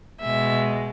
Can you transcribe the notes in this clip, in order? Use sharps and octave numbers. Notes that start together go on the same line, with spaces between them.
B2 G#3 E5